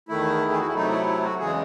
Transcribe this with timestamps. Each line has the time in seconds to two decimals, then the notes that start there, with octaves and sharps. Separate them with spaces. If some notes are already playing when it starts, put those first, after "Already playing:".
0.09 E2 D#3 A3 E4
0.51 G#4
0.59 F#4
0.67 E4
0.74 C3 F#3 A3 D#4
0.90 E4
1.07 E4
1.23 F#4
1.39 E2 C#3 E3 G#3 G#4